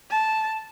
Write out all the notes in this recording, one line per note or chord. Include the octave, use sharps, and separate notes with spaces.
A5